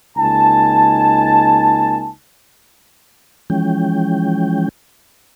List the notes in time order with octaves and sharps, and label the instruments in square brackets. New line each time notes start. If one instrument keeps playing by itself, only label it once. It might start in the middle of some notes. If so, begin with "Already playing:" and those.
[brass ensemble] C#2 A#3 D#4 G#5 A5
[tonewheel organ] E3 F3 G#3 C#4 G5